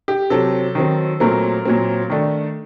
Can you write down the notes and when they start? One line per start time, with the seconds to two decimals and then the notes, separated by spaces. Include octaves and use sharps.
0.08 G4
0.30 C3 F#3 C4 A4
0.75 D#3 F#3 C4
1.20 A#2 F#3 A3 C4 A#4
1.65 A#2 F#3 C4
2.10 D#3 A3 D4